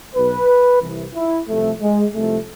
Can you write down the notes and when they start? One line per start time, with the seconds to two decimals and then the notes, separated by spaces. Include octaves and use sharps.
0.15 B1 B2 B4
0.81 C2 C3 E3
1.15 E4
1.48 C2 C3 F3 A3
1.81 G#3
2.14 C2 C3 F3 A3